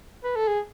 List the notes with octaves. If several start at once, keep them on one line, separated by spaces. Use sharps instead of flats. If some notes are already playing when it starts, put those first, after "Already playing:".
B4
A4
G#4